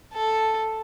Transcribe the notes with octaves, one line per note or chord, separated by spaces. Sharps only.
A4